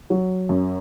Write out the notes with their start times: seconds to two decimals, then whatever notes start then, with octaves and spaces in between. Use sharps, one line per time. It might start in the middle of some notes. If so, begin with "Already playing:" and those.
0.10 F#3
0.49 F#2